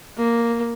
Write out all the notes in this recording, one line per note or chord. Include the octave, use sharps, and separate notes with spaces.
A#3